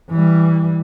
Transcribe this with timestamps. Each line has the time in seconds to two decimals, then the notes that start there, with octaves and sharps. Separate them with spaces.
0.11 E3 G3